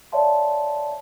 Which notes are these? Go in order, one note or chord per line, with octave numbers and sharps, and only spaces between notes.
C#5 D5 E5 F5 A5 C6